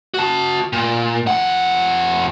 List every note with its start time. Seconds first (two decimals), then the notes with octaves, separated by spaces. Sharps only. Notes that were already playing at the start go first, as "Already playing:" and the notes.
0.14 F#4 A5
0.73 A#2
1.27 F2 F#5